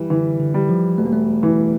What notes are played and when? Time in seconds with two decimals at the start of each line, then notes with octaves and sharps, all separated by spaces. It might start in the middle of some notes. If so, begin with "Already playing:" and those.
Already playing: E3 G3
0.10 D3 E3
0.40 D3
0.54 G3
0.69 F3
0.98 E1 A3
1.06 A#3
1.13 A3
1.43 E3